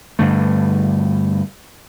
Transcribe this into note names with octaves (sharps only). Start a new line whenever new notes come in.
G2 D3 A3